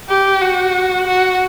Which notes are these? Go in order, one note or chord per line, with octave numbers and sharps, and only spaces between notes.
G4
F#4
F#4